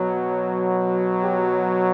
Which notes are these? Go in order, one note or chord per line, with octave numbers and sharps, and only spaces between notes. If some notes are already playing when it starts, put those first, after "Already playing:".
Already playing: B2 F#3
G4